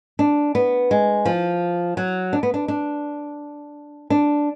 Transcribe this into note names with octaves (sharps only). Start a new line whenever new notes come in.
D4
B3
G#3
F3
F#3
D4
B3
D4
D4
D4